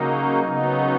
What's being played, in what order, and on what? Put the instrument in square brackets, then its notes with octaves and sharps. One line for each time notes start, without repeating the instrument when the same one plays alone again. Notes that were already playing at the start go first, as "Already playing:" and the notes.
Already playing: [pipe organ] C#3 F#3 A#3 D#4 [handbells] D#5
[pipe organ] C#3 F#3 B3 D#4